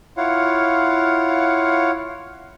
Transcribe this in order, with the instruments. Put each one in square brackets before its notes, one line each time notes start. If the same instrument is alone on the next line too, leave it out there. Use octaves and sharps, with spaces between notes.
[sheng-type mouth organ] E4 F4 C#5 F5 F#5